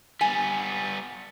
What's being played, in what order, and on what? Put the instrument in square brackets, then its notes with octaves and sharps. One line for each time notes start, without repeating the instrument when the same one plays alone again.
[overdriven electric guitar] G3 B3 [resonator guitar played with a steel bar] G#5